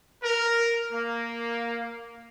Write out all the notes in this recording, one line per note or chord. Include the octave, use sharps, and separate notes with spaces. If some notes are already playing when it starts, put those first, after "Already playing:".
A#4
A#3